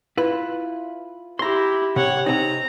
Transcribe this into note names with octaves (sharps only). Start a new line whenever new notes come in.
E4 F4 B4
E4 G4 A#5 C6
C3 C#5 F#5
C3 C4 D#4 A#5